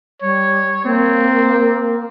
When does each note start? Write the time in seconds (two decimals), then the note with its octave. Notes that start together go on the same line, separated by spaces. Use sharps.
0.22 G3 C#5
0.85 A#3 C4